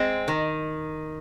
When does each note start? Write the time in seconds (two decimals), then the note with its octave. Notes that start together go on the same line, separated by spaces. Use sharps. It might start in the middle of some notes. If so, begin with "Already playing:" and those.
Already playing: G#3 C4
0.28 D#3